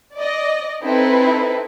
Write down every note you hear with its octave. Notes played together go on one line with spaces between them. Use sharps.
D5 D#5
C4 D#4 E4 A4 B4